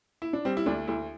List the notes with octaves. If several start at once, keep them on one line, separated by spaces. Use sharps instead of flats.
E4
D4
G3 C4
E4
D2 D4
D2 E4